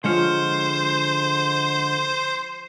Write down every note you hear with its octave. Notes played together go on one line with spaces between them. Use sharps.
D3 F3 G#3 F4 C5 C#5